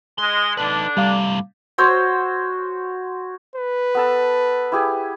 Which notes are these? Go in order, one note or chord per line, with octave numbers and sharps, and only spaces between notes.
G#3 C6
D3 D4 D#4 B4
A2 C3 G3 F5 D6
F#4 C5 C#5 E6
B4
B3 A4 A5
E4 G4 G#4